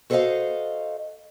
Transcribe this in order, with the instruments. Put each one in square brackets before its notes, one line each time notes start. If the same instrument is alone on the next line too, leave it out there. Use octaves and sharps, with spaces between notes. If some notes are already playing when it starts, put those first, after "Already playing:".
[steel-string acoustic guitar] F#4 A4 C5 C#5 D#5 F5